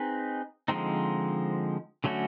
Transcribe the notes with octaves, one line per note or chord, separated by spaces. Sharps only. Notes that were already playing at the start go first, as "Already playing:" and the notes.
Already playing: C4 D#4 G#4 B4
D3 F3 G#3 C4 D#4
D3 F#3 A3 C#4 F#4